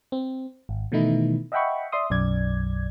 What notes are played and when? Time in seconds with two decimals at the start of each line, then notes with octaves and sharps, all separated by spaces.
0.12 C4
0.69 G#1
0.92 B2 D#3 E3 A3 D#4 E4
1.52 D#5 E5 F#5 G5 B5 C#6
1.92 D5 E5 C6 D#6
2.10 B1 F#2 D5 G#6